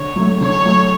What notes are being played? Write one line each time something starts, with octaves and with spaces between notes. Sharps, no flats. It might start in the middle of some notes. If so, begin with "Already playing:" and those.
Already playing: D3 C#5
F#3 A3
D3 C#5
F#3 A3